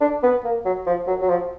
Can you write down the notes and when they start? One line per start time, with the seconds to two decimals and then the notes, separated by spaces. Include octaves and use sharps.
0.01 D4
0.23 B3
0.44 A#3
0.65 F#3
0.86 F3
1.07 F#3
1.21 F#3
1.28 F3